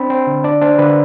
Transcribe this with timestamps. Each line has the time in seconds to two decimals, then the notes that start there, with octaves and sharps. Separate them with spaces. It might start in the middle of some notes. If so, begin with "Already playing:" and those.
Already playing: C4 D4 B5
0.10 C4
0.27 D3
0.44 D4 D5
0.61 D4 C5
0.78 D3 B4